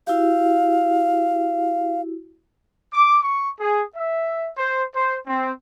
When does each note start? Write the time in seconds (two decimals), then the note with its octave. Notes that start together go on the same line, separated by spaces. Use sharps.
0.07 E4 F#4 G4 F5
2.93 D6
3.21 C#6
3.59 G#4
3.95 E5
4.57 C5
4.95 C5
5.27 C4